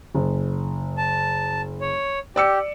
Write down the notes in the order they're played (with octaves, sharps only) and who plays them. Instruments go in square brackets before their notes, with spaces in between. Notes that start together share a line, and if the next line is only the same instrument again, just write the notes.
[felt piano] F#1
[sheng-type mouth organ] A5
C#5
[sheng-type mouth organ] G4 [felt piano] D5 E6 C#7